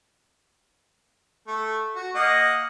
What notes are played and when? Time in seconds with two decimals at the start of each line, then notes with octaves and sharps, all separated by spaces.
1.48 A3
1.96 F#4
2.15 A#3 D#5 F#5